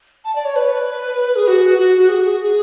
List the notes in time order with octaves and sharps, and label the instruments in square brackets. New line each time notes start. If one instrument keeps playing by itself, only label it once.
[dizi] A5
D5
C#5
B4
G#4
F#4
F#4
G#4
G#4
G#4